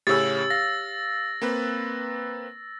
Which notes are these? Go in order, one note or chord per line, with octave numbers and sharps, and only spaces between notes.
A2 C#3 C#4 G4 C#5 E6 A6
F5 A#6
A#3 C4 B4